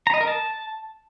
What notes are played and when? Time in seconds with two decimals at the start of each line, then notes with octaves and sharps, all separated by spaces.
0.07 A#5
0.14 D#5
0.21 A#4
0.28 A5